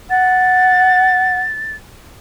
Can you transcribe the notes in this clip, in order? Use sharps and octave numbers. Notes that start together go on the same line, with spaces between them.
F#5 A6